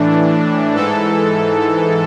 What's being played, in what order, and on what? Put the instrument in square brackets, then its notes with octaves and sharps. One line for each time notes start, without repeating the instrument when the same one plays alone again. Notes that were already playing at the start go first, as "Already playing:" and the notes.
Already playing: [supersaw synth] A2 E3 D4
G#2 E3 A4